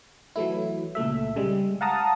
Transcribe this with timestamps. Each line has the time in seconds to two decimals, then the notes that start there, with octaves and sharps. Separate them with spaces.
0.36 E3 F#3 A3 E4
0.95 C#2 A#2 A3 E5
1.36 C#3 G3 G#3
1.81 F5 F#5 A5 A#5 D#6